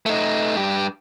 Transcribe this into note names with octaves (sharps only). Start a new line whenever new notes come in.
A3 D#4
G2 G4